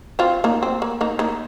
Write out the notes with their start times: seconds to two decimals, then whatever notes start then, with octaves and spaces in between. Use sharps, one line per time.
0.19 C4 F4
0.44 A#3 D#4
0.63 C4
0.82 A#3
1.01 A#3 D#4
1.19 A#3 D#4